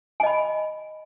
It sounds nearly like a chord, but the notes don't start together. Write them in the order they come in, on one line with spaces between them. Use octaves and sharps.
G#5 D#5 B5